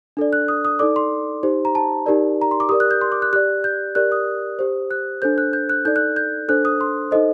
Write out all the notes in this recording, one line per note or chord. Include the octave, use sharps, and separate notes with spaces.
D4 A4 D5
F#6
D#6
D#6
D#4 A4 D5 D6
C6
D#4 G4 C5
A#5
A5
D#4 G4 A#4 D5
A#5
C6
D6
G4 A#4 D5 D#6
F#6
G6
C6
D6
F#6
G4 D5 F#6
G6
G4 A#4 D5 F#6
D#6
G4 C5
F#6
D4 A4 C5 G6
F#6
G6
F#6
D#4 A4 D5 G6
F#6
G6
D4 A4 C5 F#6
D#6
C6
D#4 A4 C5 D#5